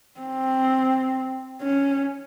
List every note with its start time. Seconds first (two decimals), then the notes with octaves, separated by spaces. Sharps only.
0.21 C4
1.63 C#4